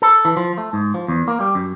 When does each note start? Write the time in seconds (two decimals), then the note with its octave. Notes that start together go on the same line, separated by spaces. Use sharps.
0.02 A4
0.25 E3
0.37 F3
0.58 A3
0.73 G#2
0.94 F3
1.08 E2
1.28 A#3
1.40 G3
1.55 F#2